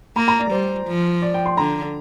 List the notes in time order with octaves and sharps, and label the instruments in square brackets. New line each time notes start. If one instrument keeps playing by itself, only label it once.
[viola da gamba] A#3 [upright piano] A#5
[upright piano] A#5
D5
[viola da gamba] G3 [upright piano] C5
[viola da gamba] F3
[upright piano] D5
G5
C6
[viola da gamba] D3 [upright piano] A#5